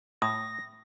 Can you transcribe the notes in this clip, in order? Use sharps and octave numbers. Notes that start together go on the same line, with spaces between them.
A2 D#6 A#6